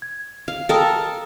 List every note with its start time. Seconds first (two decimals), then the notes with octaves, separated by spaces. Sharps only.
0.02 G#6
0.48 F5
0.69 A4 A#4 F5 G5 A5 D#6